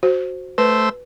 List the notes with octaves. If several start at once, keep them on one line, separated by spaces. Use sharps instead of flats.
F#4 C5
A3 B4 C5 E6